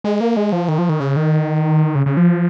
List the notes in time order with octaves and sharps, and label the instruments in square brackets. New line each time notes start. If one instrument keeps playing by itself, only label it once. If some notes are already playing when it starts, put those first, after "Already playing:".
[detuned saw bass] G#3
A#3
G#3
F3
D#3
F3
D#3
C#3
D#3
C#3
C#3
F3